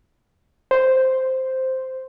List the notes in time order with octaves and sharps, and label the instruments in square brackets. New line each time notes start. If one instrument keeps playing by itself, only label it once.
[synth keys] C5